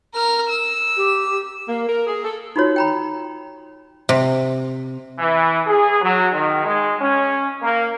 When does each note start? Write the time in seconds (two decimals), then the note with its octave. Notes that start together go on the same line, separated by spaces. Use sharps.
0.14 A#4 F6
0.49 E6
0.96 G4
1.68 A#3
1.88 A#4
2.06 G#4
2.24 A4
2.56 D#4 F4 F#4 C#5
2.76 G5 A#5 B5
4.09 C3
5.19 E3
5.67 G#4
6.02 F#3
6.33 D#3
6.64 G#3
7.01 C#4
7.62 A#3